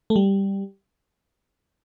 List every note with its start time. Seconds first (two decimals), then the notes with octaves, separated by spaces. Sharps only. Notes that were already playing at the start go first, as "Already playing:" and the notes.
0.10 A3
0.16 G3